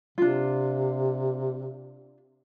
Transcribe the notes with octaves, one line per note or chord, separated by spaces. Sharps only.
C3 D4 F4